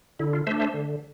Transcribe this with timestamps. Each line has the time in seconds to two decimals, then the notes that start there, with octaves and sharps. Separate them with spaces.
0.19 D3 E4
0.33 F4
0.47 A3 C5 E5
0.50 D4
0.60 C5 E5
0.74 D3